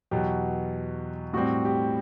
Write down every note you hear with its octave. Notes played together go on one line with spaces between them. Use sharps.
E2 B2 F#3 G4
A2 G3 C4 F#4
G4